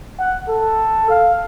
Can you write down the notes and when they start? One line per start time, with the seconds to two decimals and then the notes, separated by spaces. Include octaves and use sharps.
0.19 F#5
0.49 A4
1.10 F5